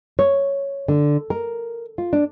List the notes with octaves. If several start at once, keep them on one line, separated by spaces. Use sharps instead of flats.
C#5
D3
A#4
F4
D4